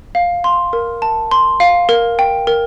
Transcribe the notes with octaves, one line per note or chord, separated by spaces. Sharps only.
F5
C6
A#4
A5
C6
F5
A#4
G5
A#4